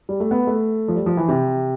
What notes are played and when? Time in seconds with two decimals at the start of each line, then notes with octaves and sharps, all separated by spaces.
0.09 G3
0.20 A3
0.31 B3
0.47 A3
0.88 F3
0.95 G3
1.06 F3
1.17 E3
1.28 C3